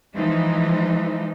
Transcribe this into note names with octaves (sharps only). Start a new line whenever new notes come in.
E3 F3 G#3 D#4